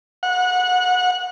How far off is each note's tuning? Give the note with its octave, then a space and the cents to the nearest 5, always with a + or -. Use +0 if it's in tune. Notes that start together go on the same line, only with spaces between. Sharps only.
F#5 -25